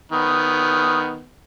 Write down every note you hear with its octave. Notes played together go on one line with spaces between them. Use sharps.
D#3 B3